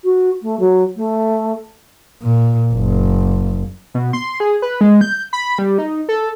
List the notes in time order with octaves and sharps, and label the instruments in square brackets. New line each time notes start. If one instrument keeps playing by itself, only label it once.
[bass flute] F#4
A3
F#3
A3
[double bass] A#2
F#1
[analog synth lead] B2
C6
G#4
B4
G#3
G6
B5
G3
D#4
A4